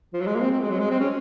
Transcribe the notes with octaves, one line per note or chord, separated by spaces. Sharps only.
F3
F#3
G#3
A#3
C4
C4
G#3
F#3
G#3
C4
C#4